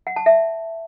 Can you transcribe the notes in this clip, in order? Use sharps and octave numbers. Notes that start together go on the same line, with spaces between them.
F#5
A5
E5